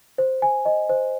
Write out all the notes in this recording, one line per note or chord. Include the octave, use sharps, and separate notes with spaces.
C5
G#5
D#5
C5